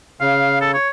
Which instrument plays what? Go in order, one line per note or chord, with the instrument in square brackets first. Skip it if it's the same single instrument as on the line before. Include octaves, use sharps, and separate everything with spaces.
[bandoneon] C#3 [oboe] F5
[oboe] A4
C#5